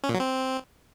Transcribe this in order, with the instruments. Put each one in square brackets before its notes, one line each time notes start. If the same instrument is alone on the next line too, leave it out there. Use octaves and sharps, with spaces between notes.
[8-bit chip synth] C#4
A#2
F#3
C4